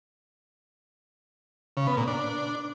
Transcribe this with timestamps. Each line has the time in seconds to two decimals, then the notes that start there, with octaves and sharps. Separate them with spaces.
1.77 C#3
1.87 B3
1.97 A#2
2.07 D4